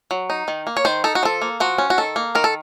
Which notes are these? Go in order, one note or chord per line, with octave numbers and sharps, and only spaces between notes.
F#3
D#4
D#3
A#3
C#5
D#3 C5
D#4 A4
F#4
F3 A4
A#3
F3 F#4
C#4
F#4
D#3 A4
A#3
D#3 A#4
A4